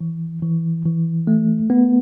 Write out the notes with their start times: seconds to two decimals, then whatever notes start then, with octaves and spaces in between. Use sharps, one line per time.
0.01 E3
0.42 E3
0.85 E3
1.27 A3
1.70 B3